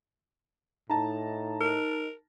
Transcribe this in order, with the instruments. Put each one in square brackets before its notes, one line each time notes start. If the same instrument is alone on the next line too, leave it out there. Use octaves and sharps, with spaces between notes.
[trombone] A2 [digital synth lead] D#4 [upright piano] A5 A#5
[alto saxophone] A#4